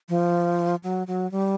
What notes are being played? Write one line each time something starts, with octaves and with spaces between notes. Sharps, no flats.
F3
F#3
F#3
G3